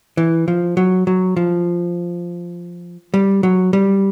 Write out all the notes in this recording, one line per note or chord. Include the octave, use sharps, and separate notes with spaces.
E3
F3
F#3
F#3
F3
G3
F#3
G3